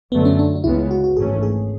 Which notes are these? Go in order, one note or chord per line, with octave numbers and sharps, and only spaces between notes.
F#2 D3 F#3 A3 B3
C#4
D4
D4
C#2 C#3 G#3 B3 E4
F#4
F#4
G#1 G#2 E3 A3 C#4 G#4
G#4